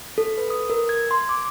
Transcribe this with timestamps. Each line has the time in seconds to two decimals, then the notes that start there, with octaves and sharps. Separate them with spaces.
0.18 A4
0.38 B4
0.50 D#6
0.70 A#4
0.89 G#6
1.11 C6
1.29 D6